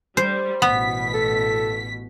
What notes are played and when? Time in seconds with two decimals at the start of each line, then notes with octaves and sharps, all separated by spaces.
0.17 G3 C5
0.62 A1 B2 B3 B6
1.14 A4